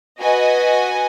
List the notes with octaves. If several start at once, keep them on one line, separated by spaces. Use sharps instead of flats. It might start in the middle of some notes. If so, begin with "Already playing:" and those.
F#4 B4 D#5 G#5